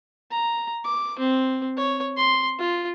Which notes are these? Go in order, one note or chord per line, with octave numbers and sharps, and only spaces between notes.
A#5
D6
C4
C#5
C6
F4